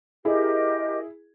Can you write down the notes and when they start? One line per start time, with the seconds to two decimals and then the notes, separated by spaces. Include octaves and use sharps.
0.25 E4 G4 G#4 A#4 D#5